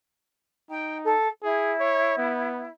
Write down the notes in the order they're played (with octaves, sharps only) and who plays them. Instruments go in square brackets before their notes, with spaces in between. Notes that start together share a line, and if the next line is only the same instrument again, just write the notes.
[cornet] D#4 [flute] G5
[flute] A4
[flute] E4 [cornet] G#4
[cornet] C#5
B3